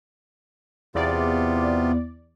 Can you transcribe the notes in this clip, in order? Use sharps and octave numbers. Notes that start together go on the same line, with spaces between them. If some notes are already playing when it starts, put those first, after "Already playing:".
E2 C3 B3 F4 D5